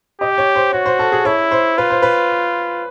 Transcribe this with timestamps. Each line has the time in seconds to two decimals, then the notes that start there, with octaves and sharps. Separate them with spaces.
0.21 G4 D#5
0.38 C#5
0.56 C5
0.73 F#4 C#5
0.86 C5
0.99 A4
1.12 G#4
1.25 E4 C#5
1.51 C5
1.78 F4 B4
1.90 C5
2.02 B4